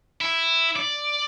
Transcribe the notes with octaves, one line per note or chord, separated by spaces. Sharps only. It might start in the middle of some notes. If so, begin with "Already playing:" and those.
E4
D5